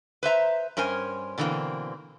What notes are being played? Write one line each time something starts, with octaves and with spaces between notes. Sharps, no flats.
B4 C5 E5 A#5
G2 C#4 A#4 C5 G#5
B2 D3 E3 F#3 A#3 C4